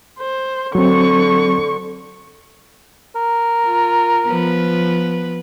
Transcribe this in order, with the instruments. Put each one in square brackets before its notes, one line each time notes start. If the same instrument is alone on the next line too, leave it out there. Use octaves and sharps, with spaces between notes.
[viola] C5
[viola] D3 C#6 [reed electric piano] F#3 C4
[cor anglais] A#4
[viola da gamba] F4
F3 B3 B4